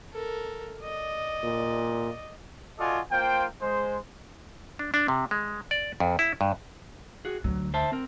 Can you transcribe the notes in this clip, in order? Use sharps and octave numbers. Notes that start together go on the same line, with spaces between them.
A4 A#4
D5 D#5
A#2
F4 F#4 A4 D5 D#5 G#5
A#3 F4 C5 G5
G#3 C5
D4
D4
C3
G#3
D5
F2
E4
G2
F#4 G#4
D2 F#3
C5 E5 A5
C4 A#4